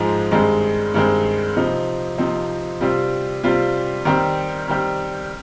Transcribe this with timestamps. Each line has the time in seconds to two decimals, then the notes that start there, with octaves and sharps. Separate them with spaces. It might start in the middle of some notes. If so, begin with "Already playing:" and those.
Already playing: G#2 F3 G#3 D#4
0.31 G2 D#3 G#3 C4
0.94 G2 D#3 G#3 C4
1.56 C3 F3 C4 D#4
2.18 C3 F3 C4 D#4
2.81 C3 G3 C4 F4
3.43 C3 G3 C4 F4
4.05 D#3 G3 C4 G4
4.68 D#3 G3 C4 G4